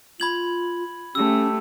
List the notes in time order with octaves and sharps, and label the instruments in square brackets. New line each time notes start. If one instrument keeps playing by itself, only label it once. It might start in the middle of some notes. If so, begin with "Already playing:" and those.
[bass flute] F4 [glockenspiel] B5 G#6 F#7
[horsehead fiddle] A3 G4 [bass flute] C#4 [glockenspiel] E6